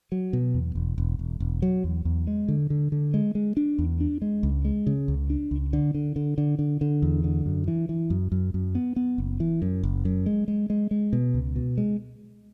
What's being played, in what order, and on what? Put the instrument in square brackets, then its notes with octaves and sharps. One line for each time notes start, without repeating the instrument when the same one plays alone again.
[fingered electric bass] F#3
B2
E2
E1
E1
E1
E1
F#3
E2
E2
G#3
D3
D3
D3
G#3
G#3
D4
E2
D4
G#3
C#2
G#3
C#3
C#2
D4
C#2
D3
D3
D3
D3
D3
D3
E2
D3
F#2
E3
E3
F#2
F#2
F#2
B3
B3
F#1
E3
F#2
F#1
F#2
G#3
G#3
G#3
G#3
B2
C#2
B2
G#3